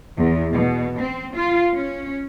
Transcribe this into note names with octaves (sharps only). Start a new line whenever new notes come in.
E2
B2
C4
F4
C#4